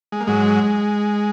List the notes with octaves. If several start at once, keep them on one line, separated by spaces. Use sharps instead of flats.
G#3
A#3
G#2 F#3 G#3